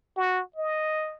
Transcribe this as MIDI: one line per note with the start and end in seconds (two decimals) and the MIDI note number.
0.17 0.42 66
0.56 1.17 75